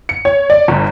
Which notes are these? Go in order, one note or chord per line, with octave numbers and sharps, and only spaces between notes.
C#7
C#5
D5
G1